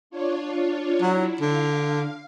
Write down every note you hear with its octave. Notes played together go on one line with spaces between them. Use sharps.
D4 F4 C#5
F#3 E4
D3 F5